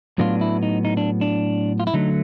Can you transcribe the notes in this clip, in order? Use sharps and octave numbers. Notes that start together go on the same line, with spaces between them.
A2 F#3 B3 D4 F4
E4
D#4
D#4
D4
D4
F4
E4
D3 F#3 A3 D#4